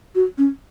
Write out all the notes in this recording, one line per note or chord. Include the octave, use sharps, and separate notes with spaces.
F#4
C#4